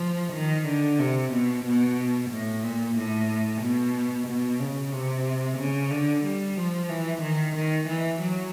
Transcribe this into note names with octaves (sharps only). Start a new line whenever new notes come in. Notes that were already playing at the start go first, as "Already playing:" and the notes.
Already playing: F3
D#3
D3
C3
B2
B2
A2
A#2
A2
B2
B2
C#3
C3
C#3
D3
G3
F3
E3
D#3
D#3
E3
F#3